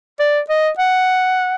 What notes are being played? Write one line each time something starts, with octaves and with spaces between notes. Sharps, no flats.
D5
D#5
F#5